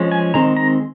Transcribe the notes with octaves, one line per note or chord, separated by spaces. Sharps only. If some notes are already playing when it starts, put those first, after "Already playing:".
Already playing: F3 G#3 C#4
G#5
D#3 G#3 C4 A#5
A#5